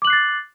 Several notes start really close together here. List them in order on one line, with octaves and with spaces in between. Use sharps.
D6 F#7 F#6 C7 A6